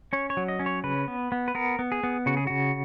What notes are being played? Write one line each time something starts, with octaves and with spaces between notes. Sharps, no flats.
C#4 C#5
C#5
F#3
D#5
C#4
C#5
C#3 B4
B3
B3
B4
B3 A#4
B3
G#4
B3
C#3 F#4
G#4
C#3 F#4